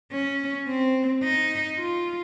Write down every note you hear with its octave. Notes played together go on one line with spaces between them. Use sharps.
C#4
C4
D#4
F4